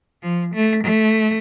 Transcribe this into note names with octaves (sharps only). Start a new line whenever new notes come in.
F3
A3
A3